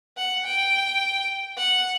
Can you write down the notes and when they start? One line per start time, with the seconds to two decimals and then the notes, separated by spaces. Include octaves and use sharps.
0.18 F#5
0.45 G5
1.57 F#5